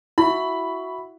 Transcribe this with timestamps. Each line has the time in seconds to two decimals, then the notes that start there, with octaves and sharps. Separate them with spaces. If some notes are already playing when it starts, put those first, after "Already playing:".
0.18 E4 F#4 E5 B5